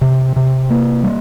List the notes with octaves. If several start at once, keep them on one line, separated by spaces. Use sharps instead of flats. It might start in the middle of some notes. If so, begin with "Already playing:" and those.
C3
C3
A#3
G3